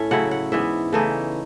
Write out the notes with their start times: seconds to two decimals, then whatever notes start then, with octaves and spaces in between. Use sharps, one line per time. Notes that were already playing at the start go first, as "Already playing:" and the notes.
Already playing: A2 C#4 A4 C#5 E5
0.11 C#3 F#3 A3 E4 F#5
0.31 F#5
0.52 G#2 E3 B3 E5
0.93 C#3 E3 A3 D#4